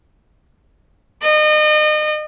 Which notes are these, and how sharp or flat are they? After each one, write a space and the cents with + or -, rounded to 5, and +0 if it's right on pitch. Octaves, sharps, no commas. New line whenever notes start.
D#5 -35